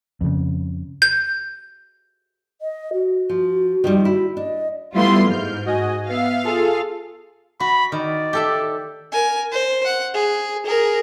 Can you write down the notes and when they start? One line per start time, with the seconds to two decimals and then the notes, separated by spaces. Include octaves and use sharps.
0.21 F2 C#3
1.02 G6
2.61 D#5
2.93 F#4
3.29 F3
3.84 D#3 F3 G3
4.05 E4 F#4
4.37 D4 D#5
4.95 G3 A3 B3 E4 F4 C6
5.27 G#2 F6 G6
5.65 F#4 D#5 G#5
6.09 B3 E5 F5
6.44 F4 G#4 A4
7.60 F#4 B5
7.92 D#3 D5
8.33 G4 A4 E5
9.12 A#4 G#5
9.52 C5
9.85 F#5
10.14 G#4
10.66 G#4 A#4